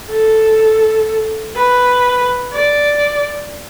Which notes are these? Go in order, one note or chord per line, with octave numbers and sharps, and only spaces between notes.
A4
B4
D5